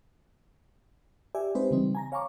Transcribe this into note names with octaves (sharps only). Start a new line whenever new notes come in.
G4 D5 E5 G#5
G#3 C4 D#4 G4 B4 C5
C#3 E3 G3 C4 D#4
G#5 A#5 A#6
C#5 F5 G#5 A#5 C#6 D6